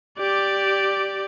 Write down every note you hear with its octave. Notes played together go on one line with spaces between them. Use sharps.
G4 D5